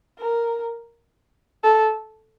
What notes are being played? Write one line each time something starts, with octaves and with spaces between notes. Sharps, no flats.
A#4
A4